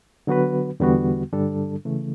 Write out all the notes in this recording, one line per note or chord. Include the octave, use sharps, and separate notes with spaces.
D3 F#3 B3 F#4 B4
E2 D3 G3 B3 F#4
G2 D3 G3 D4 A4
C#3 E3 A3